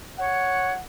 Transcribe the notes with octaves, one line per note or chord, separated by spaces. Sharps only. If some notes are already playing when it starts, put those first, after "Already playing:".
C#5 F#5